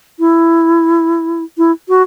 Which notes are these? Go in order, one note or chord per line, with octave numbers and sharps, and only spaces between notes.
E4
E4
F#4